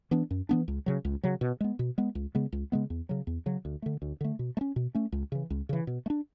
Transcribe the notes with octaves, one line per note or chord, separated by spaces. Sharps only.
E3 B3 D4
F#2
E3 B3 D4
C#2
C#3 F#3
C#2
C#3 F#3
B2
G#3 B3
B2
G#3 B3
C#2
C#3 G#3 B3
C#2
C#3 G#3 B3
E2
C#3 F#3
E2
C#3 F#3
D2
D3 A3
D2
D3 A3
B2
A3
C#4
B2
A3 C#4
C#2
C#3 E3
C#2
C#3 E3
B2
A3
D4